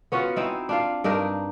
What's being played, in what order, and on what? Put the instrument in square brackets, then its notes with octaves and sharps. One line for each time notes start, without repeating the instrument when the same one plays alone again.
[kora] B3 C#4 F4 F#4
C4 D#4 E4
D4 F4 F5
G2 D4 D#4 A#4